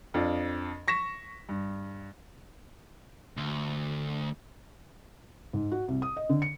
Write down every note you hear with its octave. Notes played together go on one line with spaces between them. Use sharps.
F2 D4 F4
C#6 A#6 B6 E7
G2
D2
G#2
F#4
C2
D#6
D#5
D3
C#7